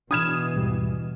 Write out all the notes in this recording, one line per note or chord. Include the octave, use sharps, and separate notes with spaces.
B2 E3 D4 B5 D#6 F6 G#6 E7
D#2 G#2 G3